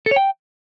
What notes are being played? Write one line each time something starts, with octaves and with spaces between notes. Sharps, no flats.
A4
C#5
G5